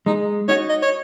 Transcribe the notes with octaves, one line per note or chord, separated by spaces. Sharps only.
G#3 D#4
D#4 F#4 C#5
D#5
C#5